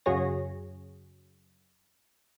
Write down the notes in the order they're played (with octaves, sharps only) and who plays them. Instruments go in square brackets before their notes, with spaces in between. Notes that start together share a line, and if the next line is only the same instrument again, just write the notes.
[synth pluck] F#2 C#3 F#4 G#4 C#5 A#6